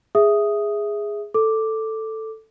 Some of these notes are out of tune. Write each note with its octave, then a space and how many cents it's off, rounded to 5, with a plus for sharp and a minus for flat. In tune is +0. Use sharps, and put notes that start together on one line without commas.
G#4 -5 E5 +0 D#6 +0
A4 +5 D6 +0